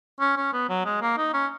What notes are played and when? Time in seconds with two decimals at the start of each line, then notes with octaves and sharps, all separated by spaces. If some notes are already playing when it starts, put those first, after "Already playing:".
0.20 C#4
0.37 C#4
0.53 B3
0.69 F#3
0.85 G#3
1.02 A#3
1.18 D#4
1.34 C#4